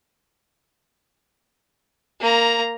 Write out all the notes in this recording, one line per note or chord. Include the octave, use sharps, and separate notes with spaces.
A#3 A#5